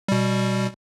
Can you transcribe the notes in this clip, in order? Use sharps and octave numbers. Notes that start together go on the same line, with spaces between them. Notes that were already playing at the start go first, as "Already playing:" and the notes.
B2 G3